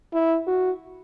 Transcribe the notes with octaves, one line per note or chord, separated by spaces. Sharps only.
E4
F#4